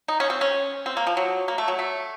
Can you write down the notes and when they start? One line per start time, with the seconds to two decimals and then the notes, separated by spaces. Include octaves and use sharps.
0.08 D#4
0.20 C#4
0.30 C4
0.41 C#4
0.86 C4
0.97 A#3
1.07 F3
1.17 F#3
1.48 A#3
1.58 A3
1.68 F#3
1.79 A3